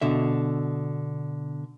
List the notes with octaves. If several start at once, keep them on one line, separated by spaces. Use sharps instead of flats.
B2 D3 E5